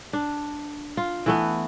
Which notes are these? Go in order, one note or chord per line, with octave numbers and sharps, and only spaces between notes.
D4
F4
E3 A3 B3